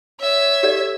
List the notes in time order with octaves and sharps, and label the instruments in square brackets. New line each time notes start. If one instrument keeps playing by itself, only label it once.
[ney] C#5 [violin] E5
[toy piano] G4 A4 D5